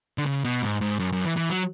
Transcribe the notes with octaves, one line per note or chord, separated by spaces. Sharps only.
D3
C#3
B2
G#2
G#2
F#2
F#2
E3
E3
F#3